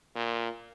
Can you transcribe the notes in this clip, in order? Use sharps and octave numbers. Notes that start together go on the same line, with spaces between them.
A#2